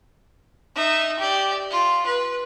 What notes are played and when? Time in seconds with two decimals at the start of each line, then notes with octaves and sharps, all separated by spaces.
0.75 D#4 E5
1.19 G4 D5
1.71 F4
2.06 B4